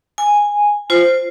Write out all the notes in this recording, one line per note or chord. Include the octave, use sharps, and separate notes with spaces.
G#5
F4 C5